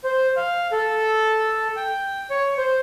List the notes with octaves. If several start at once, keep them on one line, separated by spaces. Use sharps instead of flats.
C5
F5
A4
G5
C#5
C5